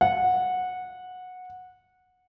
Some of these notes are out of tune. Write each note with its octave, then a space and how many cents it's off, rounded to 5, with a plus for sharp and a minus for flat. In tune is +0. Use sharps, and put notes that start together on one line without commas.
F#5 -15